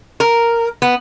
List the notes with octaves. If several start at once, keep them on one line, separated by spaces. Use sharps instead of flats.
A#4
B3